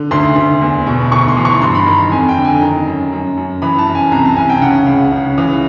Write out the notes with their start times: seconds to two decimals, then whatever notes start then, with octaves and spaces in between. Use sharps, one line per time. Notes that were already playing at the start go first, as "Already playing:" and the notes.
Already playing: D3
0.11 D2 C6
0.36 D2
0.61 E2
0.87 B2
1.12 D2 C#6
1.28 C6
1.37 E3
1.45 C#6
1.62 G2 C6
1.75 B5
1.86 D#3 A#5
2.12 F2 G#5
2.29 G5
2.37 D3
2.45 G#5
2.61 D#3 A#5
2.86 F#2
3.12 F#2
3.37 F#2
3.62 E3 B5
3.79 A5
3.87 F#2
3.95 G#5
4.11 C2 A#5
4.25 A5
4.37 C2 G#5
4.50 G5
4.61 C#3 F#5
4.87 C#2
5.12 C#3
5.38 E3